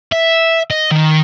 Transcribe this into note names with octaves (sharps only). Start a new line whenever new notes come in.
E5
D#5
D#3